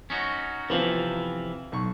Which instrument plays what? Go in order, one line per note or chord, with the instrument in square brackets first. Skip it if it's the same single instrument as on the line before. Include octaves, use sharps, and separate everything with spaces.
[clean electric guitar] C#4 D#4 F#4
[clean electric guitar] C3 E3 F3 [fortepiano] B3 C4 F4
[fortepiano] B1 C#6